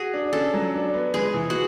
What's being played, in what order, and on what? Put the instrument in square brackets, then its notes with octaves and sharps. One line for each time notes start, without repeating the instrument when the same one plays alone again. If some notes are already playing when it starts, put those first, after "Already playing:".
Already playing: [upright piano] F#4 [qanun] G#4
[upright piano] D4
[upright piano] C#4 [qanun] A4
[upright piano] F#3
D4
B3
[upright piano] G#3 [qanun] G#4
[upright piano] E3
[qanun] F#4